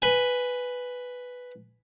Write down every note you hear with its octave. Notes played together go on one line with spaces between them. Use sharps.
B4 G#5